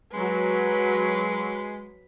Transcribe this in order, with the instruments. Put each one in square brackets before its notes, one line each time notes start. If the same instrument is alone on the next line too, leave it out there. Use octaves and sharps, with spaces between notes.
[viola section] F#3 [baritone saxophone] G#3 [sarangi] B4